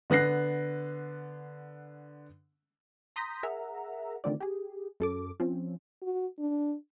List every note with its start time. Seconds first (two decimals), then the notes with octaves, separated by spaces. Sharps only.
0.10 D3 B3 F#6 A#6 C7
3.16 A#5 C6 D#6 G6 A#6 B6
3.43 G#4 A#4 E5 F#5 A#5
4.24 D3 D#3 A3 C4 F4 D5
4.40 G4 G#4
5.00 F#2 A4 D6
5.40 F3 C4 C#4
6.02 F#4
6.39 D4